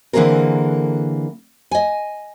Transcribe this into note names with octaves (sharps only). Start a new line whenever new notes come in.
D3 E3 A#3 C4 G#4 A#4
D#5 G#5